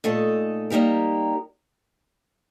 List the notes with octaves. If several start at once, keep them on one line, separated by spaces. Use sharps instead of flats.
A#2 A3 D#4 A4 D#5
G3 A#3 D#4 G4 A#4